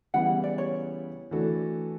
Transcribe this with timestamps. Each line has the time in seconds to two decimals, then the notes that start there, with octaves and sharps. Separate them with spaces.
0.14 C#3 E3 G3 B3 E4 F#5
0.44 D5
0.58 C#5
1.31 E3 A3 D4 F#4 A4